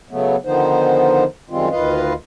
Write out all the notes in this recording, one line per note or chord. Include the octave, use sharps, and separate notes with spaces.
C#3 F#3 A3 B3
D3 D#3 F3 B3 D#4 C5
F#2 D#3 G3 G#3 C4 F4
D2 D#3 F4 B4 D#5 F5